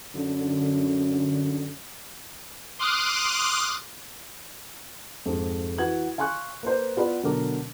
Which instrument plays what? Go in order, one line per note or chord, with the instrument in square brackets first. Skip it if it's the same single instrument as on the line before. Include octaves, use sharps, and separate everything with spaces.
[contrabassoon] F#2 [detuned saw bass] D3
[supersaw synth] C6 D6 D#6 F6 F#6
[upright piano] F2 G#2
E3 F#4 B4 G#6 F#7
F5 G#5 C6 C#6 F#6
A#3 B4 C5
B3 F4 B4 D5 B5
B2 D3 F#3 F#4 A#4 D6